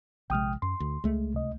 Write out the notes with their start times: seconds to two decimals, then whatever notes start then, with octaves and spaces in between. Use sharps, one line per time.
0.30 A#1 C3 G#3 G5 D#6 F6
0.62 F#2 C6
0.80 D2
1.04 C#2 G#3 A3
1.34 C2 D#5